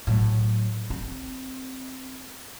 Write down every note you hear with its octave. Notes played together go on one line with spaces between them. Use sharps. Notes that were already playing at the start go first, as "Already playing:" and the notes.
A2 F#3
C4